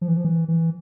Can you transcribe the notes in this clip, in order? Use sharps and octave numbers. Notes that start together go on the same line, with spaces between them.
F3
E3
F3
E3
E3